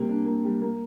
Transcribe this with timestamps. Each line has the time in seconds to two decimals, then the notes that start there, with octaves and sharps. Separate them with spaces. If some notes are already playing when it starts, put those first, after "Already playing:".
Already playing: C3 G3 A#3
0.09 D4
0.25 A#3
0.44 G3
0.62 A#3